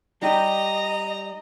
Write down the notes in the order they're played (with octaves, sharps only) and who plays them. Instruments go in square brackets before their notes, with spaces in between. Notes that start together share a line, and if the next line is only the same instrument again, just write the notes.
[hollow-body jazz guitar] G3 D#4 G4 [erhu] D#5 [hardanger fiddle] A#5